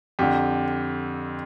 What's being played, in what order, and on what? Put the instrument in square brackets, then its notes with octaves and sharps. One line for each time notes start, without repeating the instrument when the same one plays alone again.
[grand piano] F2 D3 G4